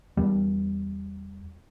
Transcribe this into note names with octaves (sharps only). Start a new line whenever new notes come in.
E2 G3